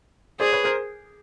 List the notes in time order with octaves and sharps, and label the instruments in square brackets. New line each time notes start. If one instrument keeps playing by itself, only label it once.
[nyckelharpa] G#4 [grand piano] C5 D5
[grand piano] B4 C#5
A#4 C5